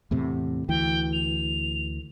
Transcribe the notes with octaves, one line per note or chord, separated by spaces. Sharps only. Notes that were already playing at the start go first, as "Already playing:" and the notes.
E2 A2 C3
D2 E3 G5
F7